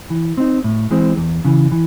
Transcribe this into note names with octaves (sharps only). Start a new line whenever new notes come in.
E3
C4 D#4
A2
E3 G#3 C4
E2
C#3 E3
E3